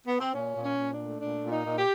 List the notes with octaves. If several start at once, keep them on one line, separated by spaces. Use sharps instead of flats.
B3
C4
A#2 C#4
A#2
C#4
A#2
D4
A3
A#2 D4
A#2
D#4
A#2
G4